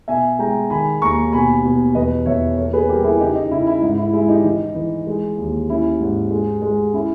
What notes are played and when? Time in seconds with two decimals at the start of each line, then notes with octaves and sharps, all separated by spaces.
0.08 B2 E5 G#5
0.39 G#3 G5 A#5
0.70 D#3 G#5 B5
1.02 D#2 A#5 C#6
1.32 B2 G#5 B5
1.64 B2
1.95 E2 B4 D#5
2.26 E2 C#5 E5
2.57 A#3 A#4 C#5
2.73 G#4 B4
2.89 G3 G4 A#4
3.04 E4 G#4
3.20 C#3 D#4 G4
3.35 D#4
3.51 C#3 E4
3.67 E4
3.82 G#2 D#4
3.98 E4
4.13 G#3 E4
4.29 D#4 G4
4.44 E3 D#4
4.75 E3
5.07 G#3
5.38 D#2
5.69 C#4 E4
6.00 G#2
6.31 G#3
6.62 G#3
6.93 C#4 E4